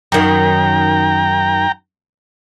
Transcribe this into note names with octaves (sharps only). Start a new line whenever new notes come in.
F#2 D#3 G5 A#5